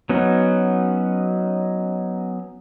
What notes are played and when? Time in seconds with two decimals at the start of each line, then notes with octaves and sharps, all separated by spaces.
0.09 F#3 B3 C#4 D#4